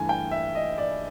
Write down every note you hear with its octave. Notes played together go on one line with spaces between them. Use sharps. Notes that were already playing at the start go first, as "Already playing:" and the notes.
Already playing: G2 E3 A3 G#5
G5
E5
D#5
D5